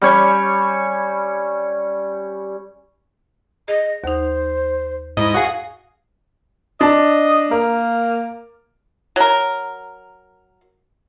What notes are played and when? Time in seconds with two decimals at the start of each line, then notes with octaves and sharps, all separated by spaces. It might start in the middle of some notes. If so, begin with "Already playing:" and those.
0.02 G3 C#4 C#5
3.68 G#4 D#5
4.04 D#2 D#4 C5
5.17 G#2 E4 D#5
5.34 F#4 G#4 F5
6.81 D4 D#5 A5
7.51 A#3 A#4
9.16 F#3 A#4